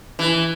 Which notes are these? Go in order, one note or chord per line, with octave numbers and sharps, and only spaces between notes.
E3